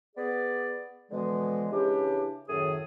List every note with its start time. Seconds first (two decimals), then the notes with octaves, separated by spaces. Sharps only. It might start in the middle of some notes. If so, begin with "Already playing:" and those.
0.16 B3 G#4 D5
1.11 B2 D3 E3 F3 G#3
1.72 C#3 E3 D4 G4
2.49 F#2 A2 D#3 G#4 A4 D#6